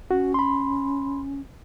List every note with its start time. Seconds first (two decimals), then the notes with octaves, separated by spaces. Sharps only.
0.11 C#4 F#4
0.34 B5 C6